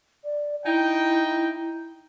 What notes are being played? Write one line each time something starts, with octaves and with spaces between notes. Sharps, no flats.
D5
D#4 E4 G5